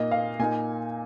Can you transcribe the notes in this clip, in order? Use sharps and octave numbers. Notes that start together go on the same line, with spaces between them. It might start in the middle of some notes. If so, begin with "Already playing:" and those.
Already playing: A#2 A#3 D#4 D#5
F5
A#2 A#3 D#4 G#5